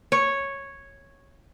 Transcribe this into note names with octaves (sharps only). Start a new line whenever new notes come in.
C#5